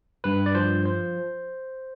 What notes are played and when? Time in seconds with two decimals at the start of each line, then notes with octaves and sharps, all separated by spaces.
0.24 G2 B4
0.46 D5
0.55 F3 C5
0.86 C5